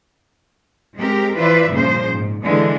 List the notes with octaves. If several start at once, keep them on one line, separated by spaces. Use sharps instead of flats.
G#3 C4 G4 A#4
E3 F4 B4 C5 D5 E5
G2 A#2 C#3 F3 C5
G#2
D3 E3 G#3